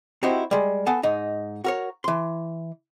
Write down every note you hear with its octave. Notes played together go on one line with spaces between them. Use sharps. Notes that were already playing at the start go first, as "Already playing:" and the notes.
C4 D#4 E4 F#4 G4 C5
G3 G#3
B3 A4 G#5 A5
G#2 D#4
F#4 A#4 C#5
E3 C6